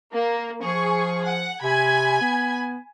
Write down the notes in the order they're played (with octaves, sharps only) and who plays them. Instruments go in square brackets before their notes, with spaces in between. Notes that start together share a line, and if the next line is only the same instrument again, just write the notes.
[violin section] A#3
[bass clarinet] F3 [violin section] G#4 C#6
[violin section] F#5
[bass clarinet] C3 [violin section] G#5 B5 G#6
[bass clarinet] B3